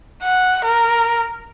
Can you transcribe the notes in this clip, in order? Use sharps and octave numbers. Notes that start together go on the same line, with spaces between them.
F#5
A#4